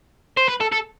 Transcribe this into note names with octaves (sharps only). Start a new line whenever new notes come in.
C5
B4
A4
A4